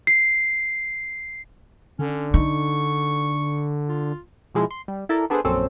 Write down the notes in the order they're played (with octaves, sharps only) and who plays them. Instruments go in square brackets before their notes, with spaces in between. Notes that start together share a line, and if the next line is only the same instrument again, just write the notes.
[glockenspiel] C7
[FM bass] D3 [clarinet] C#4
[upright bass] D#4 [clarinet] C#6
[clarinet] F4
[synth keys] B2 F3 G#3 E4
C6
G3
E4 A4 A#4 D5
B3 D4 G#4 A4 B4 C5
A#1 F#2 C4 C#4 A4